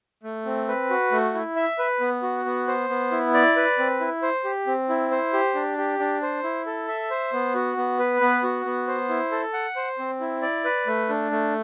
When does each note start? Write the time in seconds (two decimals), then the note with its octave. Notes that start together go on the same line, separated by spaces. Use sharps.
0.23 A3
0.46 C4
0.68 B4
0.90 F#4
1.12 A3
1.34 E4
1.56 E5
1.79 B4
2.00 B3
2.23 F#4
2.45 B3
2.68 C5
2.89 B3
3.12 E4
3.34 D5
3.56 B4
3.79 C4
4.00 E4
4.22 C5
4.44 G4
4.67 C4
4.89 E4
5.11 C5
5.33 G4
5.55 D4
5.77 G4
5.99 D4
6.22 C5
6.44 E4
6.66 A4
6.88 E5
7.10 C5
7.33 B3
7.55 F#4
7.77 B3
7.99 B4
8.21 B3
8.43 F#4
8.65 B3
8.88 C5
9.09 E4
9.32 A4
9.53 F#5
9.76 C5
9.99 C4
10.20 E4
10.42 D5
10.65 B4
10.87 A3
11.09 D4
11.31 A3